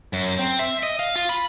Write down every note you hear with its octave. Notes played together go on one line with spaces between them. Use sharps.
F#2
C4
E5
D#5
F5
F4
B5